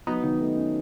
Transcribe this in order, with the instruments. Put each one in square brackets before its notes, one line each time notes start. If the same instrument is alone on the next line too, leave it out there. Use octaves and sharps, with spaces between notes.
[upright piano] F#3 [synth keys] B3 D#4
[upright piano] D#3
A3
C#4